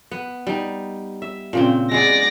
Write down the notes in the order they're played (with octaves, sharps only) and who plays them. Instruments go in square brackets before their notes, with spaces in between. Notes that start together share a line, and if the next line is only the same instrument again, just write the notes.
[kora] B3
G3 D#4
E5
A#2 C#3 C4
[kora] G#3 B3 G#4 [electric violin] D5 A#6